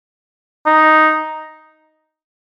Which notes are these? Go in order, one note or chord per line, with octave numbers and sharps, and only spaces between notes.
D#4